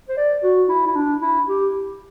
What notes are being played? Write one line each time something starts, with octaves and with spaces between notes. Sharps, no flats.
C5
D5
F#4
E4
E4
D4
E4
G4